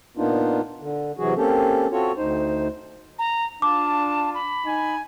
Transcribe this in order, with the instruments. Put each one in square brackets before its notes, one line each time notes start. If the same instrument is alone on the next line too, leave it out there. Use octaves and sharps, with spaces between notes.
[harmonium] A#2 A#3 B3 D4 D#4 F4
D3
C3 E3 F#3 F#4 G#4
A#3 C4 C#4 G4 A4
C4 F4 F#4 A4 C#5
D2 D#4 C5
[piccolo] A#5
[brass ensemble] D4 F4 [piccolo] A5 [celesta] D6
[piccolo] B5
[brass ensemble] D#4 G#5